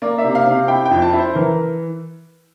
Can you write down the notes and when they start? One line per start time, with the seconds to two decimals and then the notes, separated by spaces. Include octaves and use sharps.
0.02 A#3 D5
0.18 E5
0.24 C3
0.35 F5
0.47 C3
0.52 F5
0.68 E4 G5
0.85 G5
0.91 F2
1.02 A5
1.13 E4
1.19 C5
1.35 E3 A#4